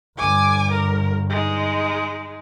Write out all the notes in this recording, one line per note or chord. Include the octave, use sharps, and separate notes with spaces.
G1 G#5 D6
A#4
G#3 D#4